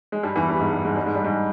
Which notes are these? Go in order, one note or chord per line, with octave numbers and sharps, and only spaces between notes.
G#3
G2 G3
E2 E3
G2 G3
G#2 G#3
G2 G3
G#2 G#3
G2 G3
G#2 G#3
G2 G3
G#2 G#3